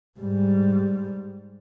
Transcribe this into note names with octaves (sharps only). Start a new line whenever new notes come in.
G#2 G3